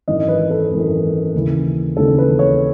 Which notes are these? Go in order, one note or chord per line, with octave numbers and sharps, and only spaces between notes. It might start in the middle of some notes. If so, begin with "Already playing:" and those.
G#1 F#2 E3 D#5
B4
A4
G#1 F#2 E3
D#2 C#3 E3
D#2 C#3 E3 A4
B4
C#5